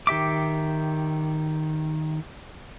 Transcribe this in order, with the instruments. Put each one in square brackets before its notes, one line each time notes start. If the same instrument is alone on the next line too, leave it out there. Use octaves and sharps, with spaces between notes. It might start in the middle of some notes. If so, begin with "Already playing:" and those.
[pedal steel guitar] D#3 G4 E5 D6